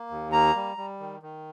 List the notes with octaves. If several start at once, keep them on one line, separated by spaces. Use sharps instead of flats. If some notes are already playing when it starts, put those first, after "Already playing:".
Already playing: A#3
D#2
A#3 A#5
G3
G3
D#3
D#3